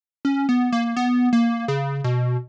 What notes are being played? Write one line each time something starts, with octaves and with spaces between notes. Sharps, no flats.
C#4
B3
A#3
B3
A#3
C#3
B2